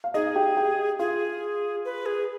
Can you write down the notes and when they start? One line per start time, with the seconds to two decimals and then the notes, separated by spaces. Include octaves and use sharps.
0.04 F5
0.14 D#4 G#4 D#5
0.35 G4 G5
0.57 G4 G5
0.99 F4 G#4 F5
1.85 B4
2.06 G#4